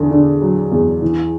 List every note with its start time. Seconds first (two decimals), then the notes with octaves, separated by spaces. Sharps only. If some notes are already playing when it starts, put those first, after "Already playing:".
Already playing: E2 D3
0.11 D3
0.42 F#3
0.72 E2
1.02 E3